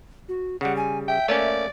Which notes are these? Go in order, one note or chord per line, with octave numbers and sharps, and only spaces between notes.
F#4
C#3 G3 F#5
G#5
E5 G5
A3 A#3 C#4 D5